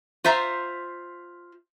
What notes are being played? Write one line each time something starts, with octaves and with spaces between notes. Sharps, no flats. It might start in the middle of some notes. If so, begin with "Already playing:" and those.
F4 C5 E5 A#5